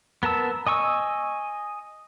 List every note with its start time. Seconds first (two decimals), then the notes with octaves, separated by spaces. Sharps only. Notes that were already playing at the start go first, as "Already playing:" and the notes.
0.23 B3 A#4 A5 E6
0.67 D#5 G#5 C#6 E6